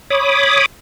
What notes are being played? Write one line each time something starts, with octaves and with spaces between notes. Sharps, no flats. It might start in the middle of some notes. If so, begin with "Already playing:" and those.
C#5 B5 D6 D#6